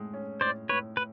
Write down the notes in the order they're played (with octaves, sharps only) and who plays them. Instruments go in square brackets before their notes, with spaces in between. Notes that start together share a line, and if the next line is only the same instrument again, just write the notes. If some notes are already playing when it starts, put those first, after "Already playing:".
Already playing: [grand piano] A2 G#3
C#4
[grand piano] A2 [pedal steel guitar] C5 D5
[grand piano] A2 [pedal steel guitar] B4 C#5
[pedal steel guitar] B4